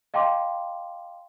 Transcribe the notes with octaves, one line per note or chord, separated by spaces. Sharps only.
D#5 F5 G5 A5 C6 D6